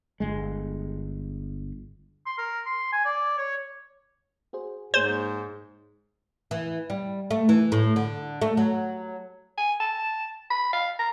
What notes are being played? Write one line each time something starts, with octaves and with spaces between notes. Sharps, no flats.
G1 G#3
C6
A#4
C6
G#5
D5
C#5
F#4 G#4 C5
G#2 A#3 G#4 C5 C#5
E3
G3
A3
E3
A2
D3
A3
F#3
G#5
A5
B5
F5
A#5